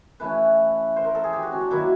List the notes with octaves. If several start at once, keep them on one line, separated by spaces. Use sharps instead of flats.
E3 A3 C#4 B4
C5
A#4
A4
G#4
G4
F#4
C#4
D4
D#3 F#3 A#3 E4